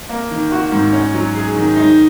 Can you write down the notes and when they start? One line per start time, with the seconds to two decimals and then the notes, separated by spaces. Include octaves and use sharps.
0.09 A#3
0.31 D#3
0.52 F#4
0.72 G#2
0.93 C#4
1.14 F#3
1.35 G#4
1.56 D#3
1.76 D#4